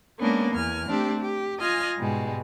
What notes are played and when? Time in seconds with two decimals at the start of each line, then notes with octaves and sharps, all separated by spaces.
0.19 G#3 A#3 B3 C#4 D4
0.52 E2 G#5 F6
0.88 A3 C4 D4 G4
1.19 G4
1.59 F4 D#5 G#5 F6 A#6
1.96 G#2 B2 G3 G#3